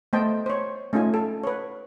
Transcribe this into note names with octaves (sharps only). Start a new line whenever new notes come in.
A3 B3 C5 D#5 G5 A5
C5 C#5
A3 C#4 D#4 F4 G#5
A4
B4 C#5